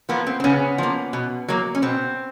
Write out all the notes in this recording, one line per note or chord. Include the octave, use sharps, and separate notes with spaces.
F3 A#3 B3
C4
C4
C#3 B3 C#4
F3 A#3
B2
F#3 A#3
C#4
B2 C4